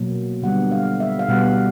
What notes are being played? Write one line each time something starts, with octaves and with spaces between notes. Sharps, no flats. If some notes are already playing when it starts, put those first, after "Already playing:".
Already playing: B2 F#3 A#3
D3 G3 B3 F#5
F5
E5
F5
B2 G3 B3 F#5